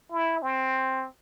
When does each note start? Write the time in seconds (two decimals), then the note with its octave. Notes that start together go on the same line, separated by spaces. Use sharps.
0.12 E4
0.42 C4